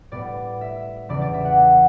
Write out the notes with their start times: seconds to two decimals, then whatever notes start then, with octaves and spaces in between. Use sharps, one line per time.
0.12 A2 G3 B3 D5
0.61 E5
1.09 E2 C#3 G3 B3 D5
1.21 D5
1.34 E5
1.45 F#5